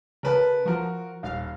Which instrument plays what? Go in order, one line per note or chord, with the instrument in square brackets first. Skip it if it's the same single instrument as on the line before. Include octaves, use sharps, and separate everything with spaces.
[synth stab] C#3 [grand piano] A#4 B4 A5
[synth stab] F3 [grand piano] F#4 A#4
[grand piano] D#1 [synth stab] F5